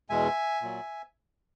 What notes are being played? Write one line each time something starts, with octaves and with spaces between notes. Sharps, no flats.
E2 B2 G#3 E5 G#5
A#2 F#3